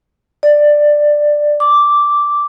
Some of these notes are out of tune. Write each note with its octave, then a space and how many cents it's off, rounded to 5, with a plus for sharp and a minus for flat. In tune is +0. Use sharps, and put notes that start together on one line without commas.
D5 +10
D6 -5